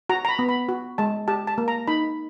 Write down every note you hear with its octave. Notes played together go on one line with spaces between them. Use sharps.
F#4 A#5
A#5
B5
B3
B5
F#4
G#3 A5
G4 A5
A5
A#3
A#5
D#4 B5